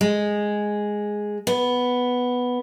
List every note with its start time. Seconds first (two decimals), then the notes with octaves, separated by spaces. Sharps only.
0.01 G#3
1.47 B3